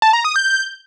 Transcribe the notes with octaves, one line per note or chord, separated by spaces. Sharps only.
A5
A#5
D#6
G6